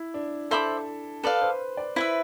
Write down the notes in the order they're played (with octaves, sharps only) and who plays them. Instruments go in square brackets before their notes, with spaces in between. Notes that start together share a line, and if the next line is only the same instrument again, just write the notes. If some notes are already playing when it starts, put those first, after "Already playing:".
Already playing: [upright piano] E4
D4
[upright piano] A4 [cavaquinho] C5 E5 B5 D6
[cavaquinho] A4 D5 F5 [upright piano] B4
[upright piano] C5
D5
[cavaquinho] E4 B4 E5 [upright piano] C5